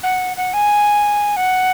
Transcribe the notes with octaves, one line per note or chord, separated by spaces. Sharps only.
F#5
F#5
G#5
F#5